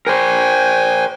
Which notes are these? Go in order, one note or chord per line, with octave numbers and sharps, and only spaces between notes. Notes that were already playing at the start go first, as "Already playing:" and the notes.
A#4 C5 G5 G#5